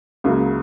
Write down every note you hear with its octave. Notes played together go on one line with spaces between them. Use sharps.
C#2 C#3 F#3 A#3